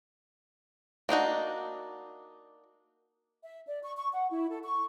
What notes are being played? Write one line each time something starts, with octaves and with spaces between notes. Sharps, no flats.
A#3 D4 D#4 F#4
E5
D5
C#6
C#6
F#5
E4
A4
C#6